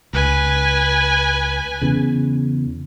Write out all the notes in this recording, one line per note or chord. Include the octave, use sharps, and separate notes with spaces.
C#2 B4 G#5
E2 C#3